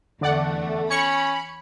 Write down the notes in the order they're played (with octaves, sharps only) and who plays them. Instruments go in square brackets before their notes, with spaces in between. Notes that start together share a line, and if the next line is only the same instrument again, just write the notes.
[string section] E2 A3 [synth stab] D3 D5 F#5
[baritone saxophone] C#4 [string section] B5 [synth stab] C#6 C#7